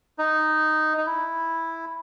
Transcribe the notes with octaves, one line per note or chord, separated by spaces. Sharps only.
D#4
D#4
E4